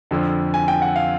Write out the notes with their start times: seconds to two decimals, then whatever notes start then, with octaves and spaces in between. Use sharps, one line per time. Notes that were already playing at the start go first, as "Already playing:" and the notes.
0.11 F2 D3 F3
0.54 G#5
0.68 G5
0.82 F#5
0.96 F5